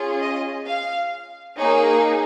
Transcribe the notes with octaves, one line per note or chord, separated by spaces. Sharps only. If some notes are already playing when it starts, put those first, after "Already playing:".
Already playing: C#4 F4 G#4
D#5
F5
A#3 D#4 G#4 C#5